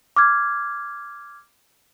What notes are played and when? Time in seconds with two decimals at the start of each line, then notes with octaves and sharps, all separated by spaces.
0.16 D6 F6 G#6